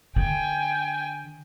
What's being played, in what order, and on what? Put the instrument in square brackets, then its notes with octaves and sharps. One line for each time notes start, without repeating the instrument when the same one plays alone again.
[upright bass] D3 [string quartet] G5 G#5